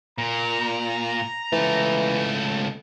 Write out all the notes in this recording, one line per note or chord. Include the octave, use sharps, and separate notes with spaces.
A#2 A#5
C#2 E3 A3